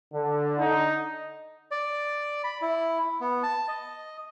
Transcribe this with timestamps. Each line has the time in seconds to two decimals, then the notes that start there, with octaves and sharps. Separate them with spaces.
0.13 D3
0.58 D#4
1.71 D5
2.44 B5
2.62 E4
3.21 B3
3.43 A5
3.68 D#5